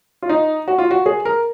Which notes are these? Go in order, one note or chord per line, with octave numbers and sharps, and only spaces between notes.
F4
D#4
F#4
F4
F#4
G#4
A#4